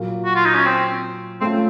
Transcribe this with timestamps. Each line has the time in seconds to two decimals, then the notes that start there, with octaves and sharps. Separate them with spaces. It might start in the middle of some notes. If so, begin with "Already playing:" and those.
Already playing: A#2 F#3 A#3
0.25 F#4
0.35 F4
0.45 D#4
0.55 C#4
0.65 C4
1.41 A3 C4 C#4 F4